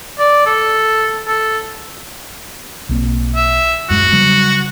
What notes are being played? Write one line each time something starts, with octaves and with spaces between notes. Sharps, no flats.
D5
A4
A4
B1 A#3 C4
E5
D#1 F#2 G#3 F#4
C#3 F#3 G3